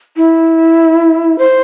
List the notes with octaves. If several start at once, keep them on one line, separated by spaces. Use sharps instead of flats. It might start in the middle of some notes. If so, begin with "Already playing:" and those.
E4
C5